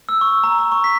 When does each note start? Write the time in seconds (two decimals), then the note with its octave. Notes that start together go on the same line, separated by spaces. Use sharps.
0.09 E6
0.21 C#6
0.44 A#5
0.59 A#5
0.72 C#6
0.84 B6